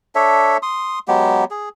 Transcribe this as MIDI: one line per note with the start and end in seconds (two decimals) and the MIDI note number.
0.15 0.57 62
0.15 0.57 69
0.15 0.57 73
0.15 0.57 76
0.63 0.99 84
0.63 0.99 87
1.08 1.44 54
1.08 1.44 56
1.08 1.44 59
1.08 1.44 67
1.51 1.69 68